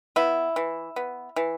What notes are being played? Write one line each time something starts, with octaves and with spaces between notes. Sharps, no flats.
B3 E4
E3
B3
E3